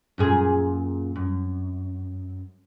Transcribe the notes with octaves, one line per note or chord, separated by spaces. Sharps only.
F#2 A#2 G#4
F#2